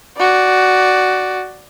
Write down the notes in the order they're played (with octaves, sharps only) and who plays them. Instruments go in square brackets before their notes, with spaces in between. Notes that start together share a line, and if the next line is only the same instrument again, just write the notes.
[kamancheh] F#4 D5